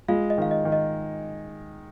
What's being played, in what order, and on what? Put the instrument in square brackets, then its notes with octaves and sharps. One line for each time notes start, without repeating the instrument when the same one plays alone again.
[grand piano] G#3 [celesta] F4 F5
[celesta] D#5
[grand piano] D#3 [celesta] F5
[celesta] D#5
[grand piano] D#3
[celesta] D#5